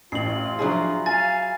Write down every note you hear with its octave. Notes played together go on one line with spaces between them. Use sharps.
A1 F4 C7 F#7
F3 F#3 D4 E4 G#4
F5 G#5 A6